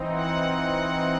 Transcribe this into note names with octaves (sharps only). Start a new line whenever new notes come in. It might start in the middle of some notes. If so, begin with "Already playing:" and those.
Already playing: E3 C4 D#4
F#5